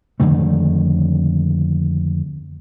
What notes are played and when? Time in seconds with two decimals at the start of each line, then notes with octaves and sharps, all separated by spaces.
0.20 F2 D3 D#3 A3